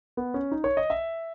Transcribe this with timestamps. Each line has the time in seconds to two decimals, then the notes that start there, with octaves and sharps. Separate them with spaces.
0.17 B3
0.34 C#4
0.52 D#4
0.64 C#5
0.77 D#5
0.90 E5